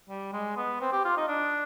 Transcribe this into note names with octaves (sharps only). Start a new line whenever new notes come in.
G3
G#3
B3
C4
G4
F4
D#4
D4